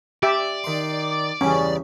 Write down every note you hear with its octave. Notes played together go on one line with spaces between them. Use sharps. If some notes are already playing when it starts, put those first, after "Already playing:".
G4 D5 E5
D#3 C6
E2 G2 C#3 C#4